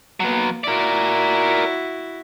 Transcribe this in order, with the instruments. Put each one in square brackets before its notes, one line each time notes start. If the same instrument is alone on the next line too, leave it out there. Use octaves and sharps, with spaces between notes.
[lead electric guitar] F#3 B3 [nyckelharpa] A#3
[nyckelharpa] E4 F#4 [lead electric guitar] A#4 D5